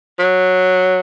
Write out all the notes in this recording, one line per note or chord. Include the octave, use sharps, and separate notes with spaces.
F#3